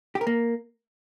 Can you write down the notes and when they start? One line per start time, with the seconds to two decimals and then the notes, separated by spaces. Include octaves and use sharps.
0.15 G4
0.21 A#4
0.27 A#3